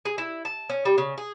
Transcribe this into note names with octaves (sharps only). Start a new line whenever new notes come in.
G#4
E4
A5
C#4
G3
C#3
G#4